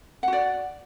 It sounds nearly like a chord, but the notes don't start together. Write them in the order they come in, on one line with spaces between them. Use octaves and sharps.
F#5 F#4 D5